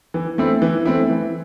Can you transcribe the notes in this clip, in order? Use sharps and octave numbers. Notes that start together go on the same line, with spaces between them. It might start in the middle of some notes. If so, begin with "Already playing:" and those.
E3
A3 C4 E4
E3
A3 C4 E4
E3